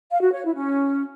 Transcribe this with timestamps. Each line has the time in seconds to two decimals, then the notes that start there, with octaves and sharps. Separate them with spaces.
0.11 F5
0.22 F#4
0.33 C#5
0.44 E4
0.55 C#4